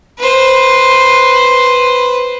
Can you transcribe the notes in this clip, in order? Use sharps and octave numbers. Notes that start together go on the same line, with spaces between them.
B4 C5